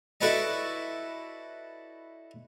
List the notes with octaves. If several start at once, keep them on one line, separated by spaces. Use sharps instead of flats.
E4 F#4 A4 B4 D5 D#5